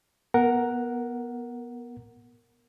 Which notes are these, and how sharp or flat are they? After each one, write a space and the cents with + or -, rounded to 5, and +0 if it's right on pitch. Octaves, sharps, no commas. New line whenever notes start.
B3 -20 A#4 +0 F#5 +0